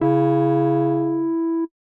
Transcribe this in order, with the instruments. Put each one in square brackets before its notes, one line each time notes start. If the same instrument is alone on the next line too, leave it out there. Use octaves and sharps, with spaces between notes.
[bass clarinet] C#3 [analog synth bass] E4